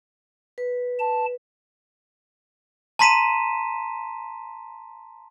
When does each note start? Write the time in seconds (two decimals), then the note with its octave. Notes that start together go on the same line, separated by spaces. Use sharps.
0.58 B4
0.99 A5
2.99 A5 A#5 C6 B6 D#7 E7